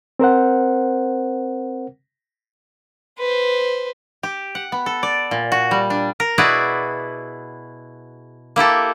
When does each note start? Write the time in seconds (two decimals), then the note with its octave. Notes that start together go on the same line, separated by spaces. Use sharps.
0.19 C4 A#4 C5 F#5
3.19 B4 C5
4.23 G4
4.55 F#5
4.72 B3
4.86 A4
5.03 D5
5.31 A#2
5.52 F#4
5.71 G3
5.90 D4
6.20 A#4
6.38 B2 E4 F#4 G#4 B4 D5
8.56 A#3 E4 G4 A4